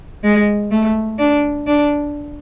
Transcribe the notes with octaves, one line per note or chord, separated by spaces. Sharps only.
G#3
A3
D4
D4